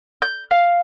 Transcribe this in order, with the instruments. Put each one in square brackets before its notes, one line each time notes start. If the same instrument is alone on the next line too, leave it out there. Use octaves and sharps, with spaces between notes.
[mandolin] G6
F5